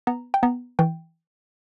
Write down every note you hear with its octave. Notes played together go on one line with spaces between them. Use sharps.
B3 A#5
G5
B3 A#5
E3 G5